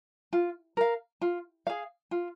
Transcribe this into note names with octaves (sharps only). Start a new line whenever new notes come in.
F4
A#4 F5
F4
G#4 F5
F4